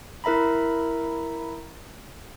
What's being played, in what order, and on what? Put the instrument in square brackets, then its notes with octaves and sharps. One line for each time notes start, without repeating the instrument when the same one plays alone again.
[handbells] E4 A#4 E5 A#5 B5